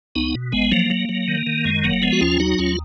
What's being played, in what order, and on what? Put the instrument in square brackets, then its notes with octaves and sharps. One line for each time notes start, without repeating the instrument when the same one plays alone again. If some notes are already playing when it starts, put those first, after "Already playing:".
[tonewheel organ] C#2 B3 D#4
B2
G#1 G#3 B3
F3 F#3 A#3
F#3
F#3
D#3
D#3
F#2 G#3
F#1 F#3 A#3
F3 G#3 B3
F#4
D#2 C#4 F4
F#3 D#4 F#4
D#2 C#4 F4